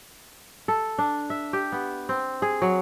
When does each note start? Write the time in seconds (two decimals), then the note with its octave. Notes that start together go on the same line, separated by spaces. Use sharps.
0.68 A4
0.99 D4
1.30 E5
1.53 G4
1.72 B3
2.09 C4
2.42 G#4
2.62 F#3